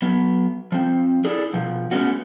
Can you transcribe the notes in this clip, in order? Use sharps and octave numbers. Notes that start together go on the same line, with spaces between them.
F#3 B3
F3 C4
D4 E4 G#4 A4
B2 F3
G#3 A3 B3 C#4 F#4